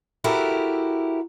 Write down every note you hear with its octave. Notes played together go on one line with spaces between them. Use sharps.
E4 F#4 G4 A4 A#4